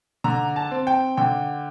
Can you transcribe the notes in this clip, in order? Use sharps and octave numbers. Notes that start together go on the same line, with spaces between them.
D3 A#5
A5
C4
G5
D3 G5